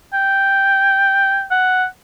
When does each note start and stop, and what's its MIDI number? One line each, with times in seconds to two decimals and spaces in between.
0.14 1.45 79
1.51 1.86 78